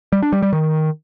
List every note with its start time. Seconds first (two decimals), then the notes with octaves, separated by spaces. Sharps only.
0.12 G3
0.22 D4
0.33 G3
0.43 G3
0.53 D#3